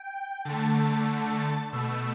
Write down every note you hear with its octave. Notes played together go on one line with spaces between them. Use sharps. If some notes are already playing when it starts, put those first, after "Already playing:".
Already playing: G5
D3 A3 A5
B2 A3 E6